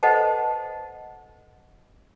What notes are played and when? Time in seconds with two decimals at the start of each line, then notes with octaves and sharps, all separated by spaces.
0.03 A4 B4 C5 D#5 F#5 A5